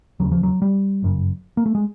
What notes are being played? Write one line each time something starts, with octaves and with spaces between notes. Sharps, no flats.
E1 D#2 C#3 F#3
F3
F#3
G3
G1 F#2 C#3
A#3
A3
G#3